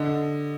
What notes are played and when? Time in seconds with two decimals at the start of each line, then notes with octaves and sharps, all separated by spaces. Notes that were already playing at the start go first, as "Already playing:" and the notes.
Already playing: D3 D#5